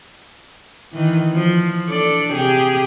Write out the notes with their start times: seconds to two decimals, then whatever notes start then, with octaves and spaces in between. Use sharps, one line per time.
0.93 D#3 E3
1.34 F3
1.89 D4 A4 D5
2.32 C3 G4 G#4